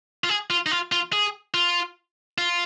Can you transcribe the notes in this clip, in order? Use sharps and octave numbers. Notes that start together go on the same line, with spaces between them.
F4
G#4
F4
D#4
F4
F4
G#4
F4
F4